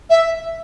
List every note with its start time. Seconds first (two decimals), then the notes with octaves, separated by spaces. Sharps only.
0.10 E5